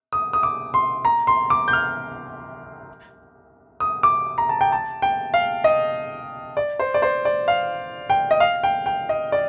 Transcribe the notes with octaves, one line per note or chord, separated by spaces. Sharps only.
D#6
D#6
D6
C6
A#5
C6
D6
G6
F6
D#6
D6
A#5
A5
G5
A5
G5
F5
D#5
D5
C5
D5
C5
D5
F5
G5
D#5
F5
G5
G5
D#5
D5